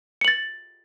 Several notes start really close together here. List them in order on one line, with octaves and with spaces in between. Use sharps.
C#7 F#7 A6